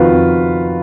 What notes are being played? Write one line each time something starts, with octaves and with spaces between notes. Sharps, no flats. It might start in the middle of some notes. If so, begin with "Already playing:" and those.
Already playing: F2 D#3 F4 F#4 B4
F2